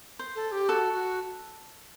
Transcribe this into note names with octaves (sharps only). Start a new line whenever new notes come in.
C5
A4
G4
F#4 A4
F#4